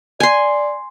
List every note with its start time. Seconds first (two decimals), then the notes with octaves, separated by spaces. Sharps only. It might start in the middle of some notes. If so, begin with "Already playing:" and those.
0.20 D5 G#5 C6